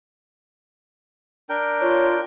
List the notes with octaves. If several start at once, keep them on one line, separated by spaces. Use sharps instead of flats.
D4 A#4 G5
F4 C#5